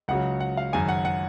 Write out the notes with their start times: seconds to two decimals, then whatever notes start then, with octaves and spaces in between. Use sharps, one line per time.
0.08 C#2 C#3 F#3 F#5
0.40 F#5
0.57 F5
0.73 G#1 F#2 C#3 G#5
0.88 F#5
1.05 F#5